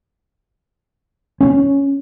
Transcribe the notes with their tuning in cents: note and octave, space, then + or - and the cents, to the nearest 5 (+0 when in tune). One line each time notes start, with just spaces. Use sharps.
C#4 +5